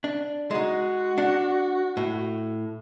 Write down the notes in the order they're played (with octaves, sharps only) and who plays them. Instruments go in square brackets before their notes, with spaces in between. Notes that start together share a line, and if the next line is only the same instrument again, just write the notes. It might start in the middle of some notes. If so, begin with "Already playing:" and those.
[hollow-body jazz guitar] D4
[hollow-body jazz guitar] G#3 D#4 [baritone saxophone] F#4
[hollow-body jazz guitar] D4 F#5
A2